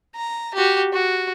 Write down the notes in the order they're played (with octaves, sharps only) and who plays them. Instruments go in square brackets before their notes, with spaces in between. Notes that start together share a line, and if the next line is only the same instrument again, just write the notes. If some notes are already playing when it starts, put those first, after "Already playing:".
[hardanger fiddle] A#5
F#4 G4
F#4